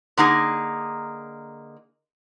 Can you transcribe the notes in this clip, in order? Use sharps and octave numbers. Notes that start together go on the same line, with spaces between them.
D3 A#3 D#4 G#4